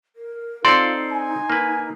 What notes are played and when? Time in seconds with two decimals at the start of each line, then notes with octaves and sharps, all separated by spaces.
0.16 A#4
0.65 C4 D#4 F4 A4 D5 C6
1.12 G#5
1.50 A#3 B4